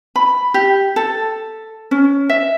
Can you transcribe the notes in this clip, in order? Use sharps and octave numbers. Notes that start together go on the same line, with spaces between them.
B5
G4
A4
C#4
E5